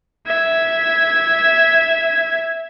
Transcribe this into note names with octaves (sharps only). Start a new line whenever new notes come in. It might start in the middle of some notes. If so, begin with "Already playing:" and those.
E5 G#6